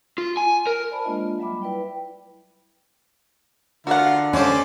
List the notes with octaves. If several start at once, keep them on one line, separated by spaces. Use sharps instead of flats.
F4
G#5
A#4
C5 D5 A5 B5
G#3 A#3 D4 F4 D#5 E5
F#3 G3 E5 B5 D6
E4 B4 D5 G5
D3 F4 F#4 A#4 F5 F#5
G#3 A3 C#4 G4 C5 D5